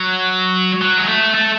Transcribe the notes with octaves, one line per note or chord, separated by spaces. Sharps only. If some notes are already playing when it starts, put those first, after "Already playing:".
Already playing: F#3
F#3
G#3
A3
A3